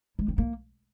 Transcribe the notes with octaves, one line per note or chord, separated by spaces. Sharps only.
G#3
C4
A#3